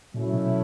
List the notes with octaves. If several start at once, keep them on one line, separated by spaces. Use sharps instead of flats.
A#2 F#3 A3 C#4 E4
B2